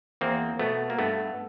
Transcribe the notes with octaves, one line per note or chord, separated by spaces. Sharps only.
E2 A#3 C4
B2 A3 B3
A#3
G2 A3 B3